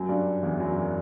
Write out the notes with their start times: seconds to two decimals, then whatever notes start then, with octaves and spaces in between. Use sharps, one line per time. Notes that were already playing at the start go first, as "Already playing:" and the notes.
Already playing: F#2 F#3
0.09 G2 G3
0.43 E2 E3
0.60 F#2 F#3
0.77 E3